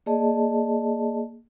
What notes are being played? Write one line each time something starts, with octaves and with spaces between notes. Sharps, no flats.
A#3 G#4 D5 D#5 A5